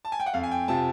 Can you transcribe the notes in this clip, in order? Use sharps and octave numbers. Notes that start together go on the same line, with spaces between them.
A5
G#5
G5
F#5
F2 F5
G#5
G5
C3 F3 A5